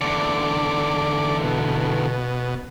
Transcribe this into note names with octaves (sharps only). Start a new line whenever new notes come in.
E2 D3 D5
B2